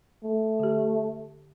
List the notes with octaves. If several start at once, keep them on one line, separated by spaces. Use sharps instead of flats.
A3
D3 G4